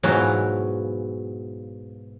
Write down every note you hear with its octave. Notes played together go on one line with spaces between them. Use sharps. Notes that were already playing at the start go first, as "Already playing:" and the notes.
G#2 B2 E3 F#3 B3 F4